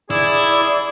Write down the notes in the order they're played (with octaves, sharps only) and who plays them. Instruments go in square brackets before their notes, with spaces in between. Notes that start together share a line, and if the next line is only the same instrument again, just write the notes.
[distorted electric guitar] E4 [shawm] G#4 [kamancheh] D5